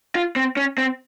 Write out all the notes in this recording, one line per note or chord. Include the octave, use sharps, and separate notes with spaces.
F4
C4
C#4
C4